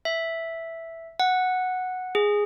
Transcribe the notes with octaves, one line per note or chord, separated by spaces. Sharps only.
E5
F#5
G#4